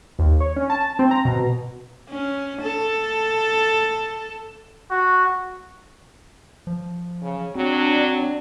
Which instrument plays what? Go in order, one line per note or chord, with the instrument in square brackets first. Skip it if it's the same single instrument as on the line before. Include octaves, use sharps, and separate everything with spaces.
[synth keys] D#2
C#5
C#4
A5
C4
A#5
B2
[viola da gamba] C#4
A4
[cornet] F#4
[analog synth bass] F3
[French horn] C#3
[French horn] F#3 [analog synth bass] C4 [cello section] D4